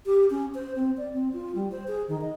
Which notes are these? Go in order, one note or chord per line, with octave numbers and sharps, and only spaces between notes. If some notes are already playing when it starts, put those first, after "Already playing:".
G4
C#4
C5
C4
D5
C4
F4
G3
C5
G#4
D#3
D#5